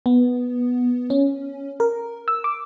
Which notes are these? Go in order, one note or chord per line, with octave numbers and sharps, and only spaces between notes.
B3
C#4
A#4
E6
D6